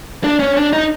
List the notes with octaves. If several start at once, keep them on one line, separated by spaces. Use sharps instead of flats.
D4
C#4
D4
D#4